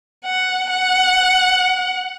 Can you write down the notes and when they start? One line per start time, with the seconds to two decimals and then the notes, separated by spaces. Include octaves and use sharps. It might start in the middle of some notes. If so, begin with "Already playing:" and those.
0.25 F#5
0.70 F#5